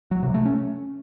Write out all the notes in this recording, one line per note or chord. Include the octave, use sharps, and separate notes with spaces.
F#3
C3
A3
C#4